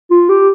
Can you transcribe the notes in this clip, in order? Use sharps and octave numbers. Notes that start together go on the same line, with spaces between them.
F4
G4